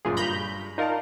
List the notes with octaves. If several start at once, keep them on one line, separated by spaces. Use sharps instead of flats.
G1 F#2 A#2 F4 G#4
G2 A#5 B5 G6
D#4 F4 A#4 D5 F5 A5